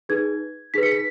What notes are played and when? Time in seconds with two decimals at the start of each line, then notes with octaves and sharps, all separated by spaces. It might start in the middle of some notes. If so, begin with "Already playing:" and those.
0.09 D#4 G#4 B4 G#6
0.74 D#4 G#4 B4 B6
0.83 C#7
0.92 B6